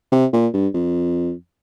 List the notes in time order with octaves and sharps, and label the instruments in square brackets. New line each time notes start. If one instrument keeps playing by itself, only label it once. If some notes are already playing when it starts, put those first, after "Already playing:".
[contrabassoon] C3
A#2
G2
F2